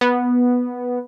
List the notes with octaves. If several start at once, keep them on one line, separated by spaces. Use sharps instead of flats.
B3